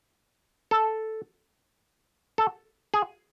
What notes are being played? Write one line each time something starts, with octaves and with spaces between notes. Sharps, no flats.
A4
A4
G#4